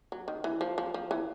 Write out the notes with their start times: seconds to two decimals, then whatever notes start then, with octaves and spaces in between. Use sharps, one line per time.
0.12 F#3
0.28 D#3
0.44 E3
0.61 F3
0.78 F3
0.94 F3
1.11 E3